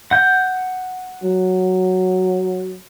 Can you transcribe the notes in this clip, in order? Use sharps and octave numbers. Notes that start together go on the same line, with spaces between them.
F#5 G6
F#3